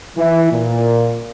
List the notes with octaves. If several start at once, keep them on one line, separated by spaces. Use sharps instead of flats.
E3
A#2